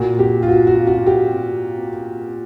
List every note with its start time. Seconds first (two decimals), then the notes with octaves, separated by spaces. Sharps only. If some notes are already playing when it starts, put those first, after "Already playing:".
Already playing: A#2 F#4
0.19 G4
0.43 F4
0.48 F#4
0.67 F#4
0.87 F#4
1.07 G4